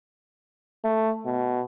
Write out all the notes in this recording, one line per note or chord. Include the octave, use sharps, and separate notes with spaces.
A3
B2